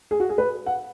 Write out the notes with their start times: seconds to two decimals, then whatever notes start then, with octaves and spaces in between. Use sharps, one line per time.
0.11 G#4
0.20 F#4
0.29 G#4
0.38 B4
0.66 F#5